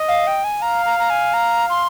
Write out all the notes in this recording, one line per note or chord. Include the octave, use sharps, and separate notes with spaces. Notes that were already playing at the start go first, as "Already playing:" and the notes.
Already playing: D#5
F5
G5
G#5
F5 A#5
A#5
A#5
G#5
A#5
C6